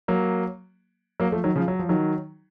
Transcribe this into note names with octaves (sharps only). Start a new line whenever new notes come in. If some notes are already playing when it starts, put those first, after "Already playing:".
F#3 A#3
F#3 A#3
F3 A3
D#3 F#3
C#3 F3
F#3
F3
D#3 F#3